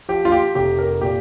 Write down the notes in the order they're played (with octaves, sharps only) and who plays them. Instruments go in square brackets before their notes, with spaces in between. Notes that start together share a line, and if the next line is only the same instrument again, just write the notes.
[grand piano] F3 G4
F4
G4
F1 G4
A#4
A#2 G4